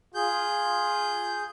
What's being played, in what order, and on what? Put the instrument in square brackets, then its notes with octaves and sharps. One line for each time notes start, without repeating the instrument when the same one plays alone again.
[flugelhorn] F4 [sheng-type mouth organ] G#4 G6